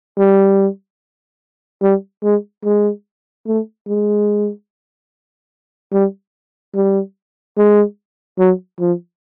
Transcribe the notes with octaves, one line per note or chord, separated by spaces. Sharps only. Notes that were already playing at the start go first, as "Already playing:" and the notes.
G3
G3
G#3
G#3
A3
G#3
G3
G3
G#3
F#3
F3